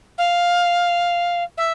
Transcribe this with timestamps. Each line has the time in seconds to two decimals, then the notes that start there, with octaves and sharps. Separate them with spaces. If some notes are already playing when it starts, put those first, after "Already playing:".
0.18 F5
1.57 E5